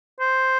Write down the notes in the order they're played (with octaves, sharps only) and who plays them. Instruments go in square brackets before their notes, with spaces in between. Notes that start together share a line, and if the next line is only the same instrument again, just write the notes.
[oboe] C5